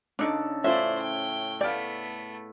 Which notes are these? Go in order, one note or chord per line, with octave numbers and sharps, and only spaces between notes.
C#3 D4 D#4 A4 D5
A2 C#4 E4 F4 C5 D5 E5
G5
A3 B3 D5 F5 G5